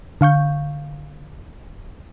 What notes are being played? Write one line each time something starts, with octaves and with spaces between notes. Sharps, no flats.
D3 F5 C#6 G6